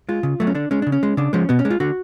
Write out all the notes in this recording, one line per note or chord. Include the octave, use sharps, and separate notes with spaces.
G#3 F4
C#3
F#3 A3
C#4
D3 D4
G#3 C#4
C#3 D4
C#4
G#3
C#3 D4
F3 G#3 C#4
B2 B3
C#4
G#3
F4
D3 F#4